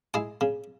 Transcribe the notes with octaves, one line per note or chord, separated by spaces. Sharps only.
G#3 E4 G#4
C#3